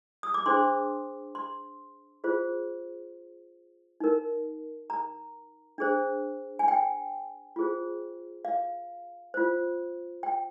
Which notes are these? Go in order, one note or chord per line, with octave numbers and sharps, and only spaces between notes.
D#6
D6
D4 G#4 C5 C6
C6
F4 G#4 C5
D#4 A#4
A#5
D4 G#4 C5
G#5
G5
F4 G#4 C5
F5
F4 C5
G5